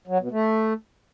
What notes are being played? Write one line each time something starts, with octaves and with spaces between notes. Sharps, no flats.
F#3
B2
A3